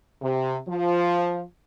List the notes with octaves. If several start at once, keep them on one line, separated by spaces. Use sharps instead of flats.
C3
F3